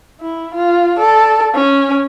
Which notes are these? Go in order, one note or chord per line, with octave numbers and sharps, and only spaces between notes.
E4
F4
A4 D5
C#4